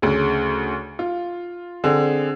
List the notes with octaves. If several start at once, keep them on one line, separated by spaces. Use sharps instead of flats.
D2 C#3
F4
D3 C4 G#4